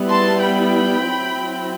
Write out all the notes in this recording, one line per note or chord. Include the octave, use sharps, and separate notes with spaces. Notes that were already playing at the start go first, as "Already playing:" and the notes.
Already playing: G3 B3 E4
A5 C6
G5 B5
F#3 C4 E4